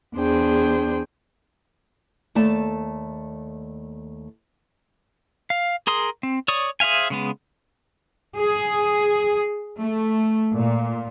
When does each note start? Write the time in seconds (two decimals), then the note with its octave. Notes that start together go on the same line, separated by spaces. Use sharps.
0.15 E2 D4 G#4 C5 G5
2.35 D#2 A3 D5 A5
5.50 F5
5.87 G#4 A#4 C6 D#6
6.23 C4
6.48 C#5 D5 C#6 D#6
6.80 G#4 C5 E5 F5 G#5
7.10 C#3 G#3 B3
8.36 G#4
9.79 A3
10.53 A#2